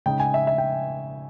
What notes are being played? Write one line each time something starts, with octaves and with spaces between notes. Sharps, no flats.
C#3 G#3 D#4 G5
G#5
E5
E5
G5